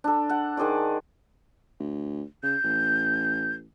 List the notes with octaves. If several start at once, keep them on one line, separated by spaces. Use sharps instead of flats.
D4 A4
F#5
D#3 G#4 C5 D5
D2
C#3 G6
A1